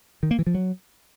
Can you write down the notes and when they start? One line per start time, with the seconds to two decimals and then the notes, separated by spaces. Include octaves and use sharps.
0.23 D#3
0.31 A#3
0.39 E3
0.47 F3
0.54 F#3